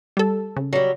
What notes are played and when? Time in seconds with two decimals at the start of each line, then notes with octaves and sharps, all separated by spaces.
0.17 G3 A4
0.57 C#3
0.73 F#3 G3